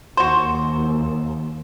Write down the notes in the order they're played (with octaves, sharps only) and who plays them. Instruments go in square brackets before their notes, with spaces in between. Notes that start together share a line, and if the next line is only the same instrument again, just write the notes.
[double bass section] D#2 [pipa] F#4 C5